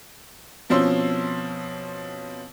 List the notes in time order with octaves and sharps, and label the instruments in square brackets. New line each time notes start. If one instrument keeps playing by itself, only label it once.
[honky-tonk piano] B2 F3 C4 C#4 C6 E6